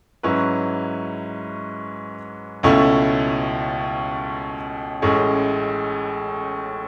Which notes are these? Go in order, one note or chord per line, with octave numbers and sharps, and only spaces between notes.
G#2 F#3 C#4 E4 B4
C#2 B2 A3 C#4 E4
A1 A2 G#3 C#4 G#4